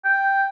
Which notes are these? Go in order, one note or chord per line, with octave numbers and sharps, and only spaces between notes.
G5